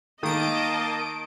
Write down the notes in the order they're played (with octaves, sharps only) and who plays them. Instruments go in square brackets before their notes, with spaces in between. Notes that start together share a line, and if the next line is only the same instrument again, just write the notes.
[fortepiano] D#3 [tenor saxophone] A#3 [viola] D#5 A5 [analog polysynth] D#6 D7